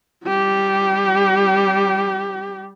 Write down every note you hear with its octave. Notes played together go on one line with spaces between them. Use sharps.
G3 G4